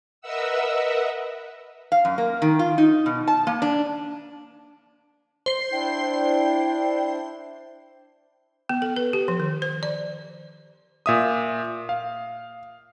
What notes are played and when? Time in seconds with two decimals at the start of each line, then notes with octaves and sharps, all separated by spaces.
0.21 A#4 B4 D#5 E5 F#5 E6
1.92 F5
2.05 F#2
2.18 A#3
2.42 D#3
2.59 F4
2.78 D#4
3.06 B2
3.28 A5
3.47 A#3
3.62 D4
5.46 C5 C7
5.72 D4 E4 G5
8.69 B3
8.82 A4
8.96 B4
9.13 G4
9.28 F3
9.40 D#3
9.62 C5
9.83 D5
11.06 A#2 E5 D#6
11.89 F5